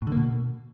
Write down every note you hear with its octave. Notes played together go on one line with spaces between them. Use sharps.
A2
D3
A#3
B2